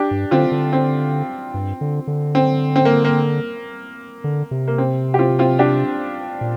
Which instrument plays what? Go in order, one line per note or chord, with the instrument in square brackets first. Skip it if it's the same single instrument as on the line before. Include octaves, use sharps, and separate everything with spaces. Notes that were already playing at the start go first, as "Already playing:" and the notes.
Already playing: [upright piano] D4 G4
[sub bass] G2
[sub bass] D3 [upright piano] C4 F4
[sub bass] D3
[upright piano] C4
[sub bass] G2
D3
D3
[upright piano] C4
C4
A#3
A#3
[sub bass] D3
C3
[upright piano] A#3
C4
G4
C4 F4
C4 F4
D4 G4
[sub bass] A#2